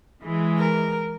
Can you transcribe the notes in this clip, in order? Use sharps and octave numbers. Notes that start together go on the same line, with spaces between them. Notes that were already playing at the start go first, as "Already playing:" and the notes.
E3 G#3
A#4